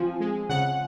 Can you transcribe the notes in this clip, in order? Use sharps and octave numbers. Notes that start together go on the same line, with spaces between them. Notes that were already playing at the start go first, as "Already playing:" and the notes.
Already playing: F3 C4 G#5
G#3
C#3 F#5